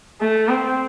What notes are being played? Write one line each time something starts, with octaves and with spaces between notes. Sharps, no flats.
A3
C4